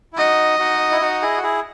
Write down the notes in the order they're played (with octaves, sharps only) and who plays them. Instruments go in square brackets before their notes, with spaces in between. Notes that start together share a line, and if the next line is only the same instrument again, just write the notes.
[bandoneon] E4
[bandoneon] D#4 F#4 [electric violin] D#5
[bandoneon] D#4 F#4
E4
D#4 F#4
E4 G#4
F#4
E4 G#4